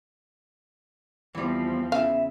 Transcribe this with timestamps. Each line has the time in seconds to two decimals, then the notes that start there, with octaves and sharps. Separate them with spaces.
1.35 E2 E3 F3 G3 C4
1.92 C#3 E4 E5 F5